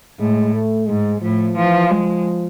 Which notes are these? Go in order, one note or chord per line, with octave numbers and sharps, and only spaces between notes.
A2 G#3
A3
G#2 G#3
A2 F3
E3 F3
F3 G#3